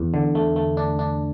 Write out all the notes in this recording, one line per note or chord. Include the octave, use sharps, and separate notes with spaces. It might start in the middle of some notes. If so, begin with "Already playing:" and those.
Already playing: E2
D3
A3
A3
D4
D4